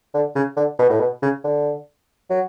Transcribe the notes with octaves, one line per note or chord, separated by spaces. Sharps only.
D3
C#3
D3
B2
A2
B2
C#3
D3
F#3